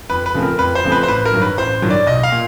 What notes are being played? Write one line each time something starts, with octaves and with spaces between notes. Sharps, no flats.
F2 B4
B4
C#3 F3 A3 C4
A#4
F2 B4
C5
C#3 F3 A3 C4
B4
C5
A1 B4
A#4
G2 D#3 F#3
B4
A1 C5
G2 D#3 F#3
D5
B1 D#5
F5
A#2